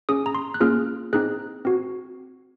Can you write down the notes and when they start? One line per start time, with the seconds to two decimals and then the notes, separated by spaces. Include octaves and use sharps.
0.09 C#4 G#4 D#6
0.26 A#5
0.35 C6
0.54 F#6
0.60 A#3 C#4 F4 G#4 F6
1.13 C4 D#4 G#4 F#6
1.65 C4 F#4